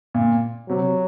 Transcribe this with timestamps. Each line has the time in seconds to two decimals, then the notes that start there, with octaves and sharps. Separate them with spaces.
0.14 A#2
0.69 C3 F#3